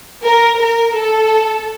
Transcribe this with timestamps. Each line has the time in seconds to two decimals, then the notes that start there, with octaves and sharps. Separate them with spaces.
0.23 A#4
0.58 A#4
0.94 A4